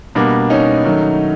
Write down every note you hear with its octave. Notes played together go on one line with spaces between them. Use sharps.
B2 G3 A#3 D4
C#4 D#4
D#3 F#3 A3